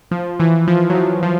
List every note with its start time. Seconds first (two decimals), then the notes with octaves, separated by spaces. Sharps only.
0.11 F3
0.40 E3
0.67 F3
0.90 F#3
0.95 F3
1.23 F3